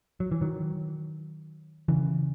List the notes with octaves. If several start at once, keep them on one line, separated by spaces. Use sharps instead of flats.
F#3
E3
D#3 F#3
C#3 E3